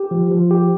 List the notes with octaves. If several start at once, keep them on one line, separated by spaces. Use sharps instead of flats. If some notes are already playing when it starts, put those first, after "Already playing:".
Already playing: G4
F3
F3
G4